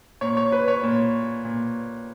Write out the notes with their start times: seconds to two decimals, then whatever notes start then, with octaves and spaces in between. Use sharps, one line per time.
0.21 A#2 C#5
0.37 C#5
0.52 B4
0.68 C#5
0.83 A#2
1.45 A#2